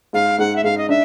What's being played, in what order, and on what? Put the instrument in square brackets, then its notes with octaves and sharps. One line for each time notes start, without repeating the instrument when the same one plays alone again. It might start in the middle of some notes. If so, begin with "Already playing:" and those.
[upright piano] G#2 [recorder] F5
[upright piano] G#2 [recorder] F#5
[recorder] E5
[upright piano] G#2 [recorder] F5
[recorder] D#5
[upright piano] D4 [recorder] E5